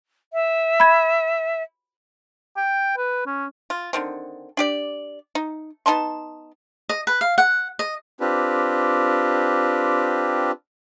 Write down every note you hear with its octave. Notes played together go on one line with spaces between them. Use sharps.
E5
B5 G#6
G5
B4
C#4
F4
D3 D#3 C4
D4 G4 D5
D#4
B3 D#4 A5 C6
D#5
B4
F5
F#5
D#5
C4 D4 F4 G4 B4